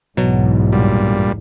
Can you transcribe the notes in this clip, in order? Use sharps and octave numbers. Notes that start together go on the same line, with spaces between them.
B1 E2 G#2 B2 F#3
G2 A#2 G3